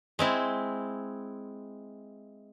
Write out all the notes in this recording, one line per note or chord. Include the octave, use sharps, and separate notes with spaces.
G#3 C4 E4